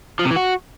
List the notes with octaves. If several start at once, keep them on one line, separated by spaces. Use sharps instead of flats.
F3
C3
E3
F#4